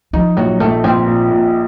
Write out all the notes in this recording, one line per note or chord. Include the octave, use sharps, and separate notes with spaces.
F3 D#4
A#1 F#3
A#1 A3
A#1 C4
A#2
A#2